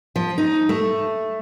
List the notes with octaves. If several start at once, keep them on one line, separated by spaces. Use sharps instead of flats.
F3
D#4
A3